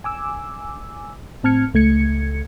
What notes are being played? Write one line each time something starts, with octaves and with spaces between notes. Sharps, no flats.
G#5 D6 E6
A2 C4 A5 F6 G#6 C#7
C#2 A3 G#6 C#7